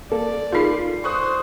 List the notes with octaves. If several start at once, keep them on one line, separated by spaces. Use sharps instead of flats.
A#3 A4 D5
D#4 F4 G#4 A#4 C7
C5 C#6 D#6 F#6